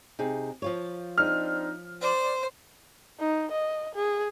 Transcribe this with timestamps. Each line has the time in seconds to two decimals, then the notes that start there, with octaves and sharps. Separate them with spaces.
0.19 C3 D#4 G#4
0.62 F3 F4 C#5
1.18 C4 D4 D#4 F6
2.02 C5 D5
3.20 D#4
3.52 D#5
3.95 G#4